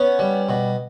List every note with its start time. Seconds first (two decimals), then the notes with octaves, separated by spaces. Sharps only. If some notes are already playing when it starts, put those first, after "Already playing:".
Already playing: B3 C#4 C#5
0.19 G3
0.49 B2